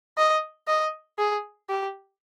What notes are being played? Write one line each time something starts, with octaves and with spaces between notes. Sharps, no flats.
D#5
D#5
G#4
G4